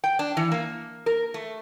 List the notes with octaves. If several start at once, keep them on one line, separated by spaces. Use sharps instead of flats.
G5
D4
E3
A#3
A#4
A3